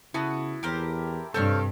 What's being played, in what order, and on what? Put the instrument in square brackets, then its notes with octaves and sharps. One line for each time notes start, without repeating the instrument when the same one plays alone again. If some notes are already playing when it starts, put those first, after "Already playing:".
[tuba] C#3 [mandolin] B3 F#4 [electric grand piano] E4 A5
[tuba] E2 [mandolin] G4 A#4 C5
[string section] G2 [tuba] C3 [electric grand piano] A4 [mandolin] C5 C#5 F6